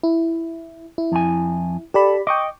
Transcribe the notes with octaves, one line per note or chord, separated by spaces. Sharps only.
E4
E4
F2 G#5
G4 A4 D5 B5
D#5 G5 C#6 D6